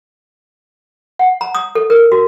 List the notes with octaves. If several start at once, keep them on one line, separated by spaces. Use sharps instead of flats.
F#5
A#5
D#6
A4
A#4
F#4